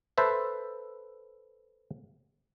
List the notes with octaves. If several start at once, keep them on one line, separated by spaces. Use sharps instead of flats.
A4 B4 C5 E5